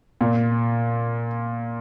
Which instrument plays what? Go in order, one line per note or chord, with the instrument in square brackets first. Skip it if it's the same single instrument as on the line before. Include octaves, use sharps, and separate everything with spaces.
[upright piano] A#2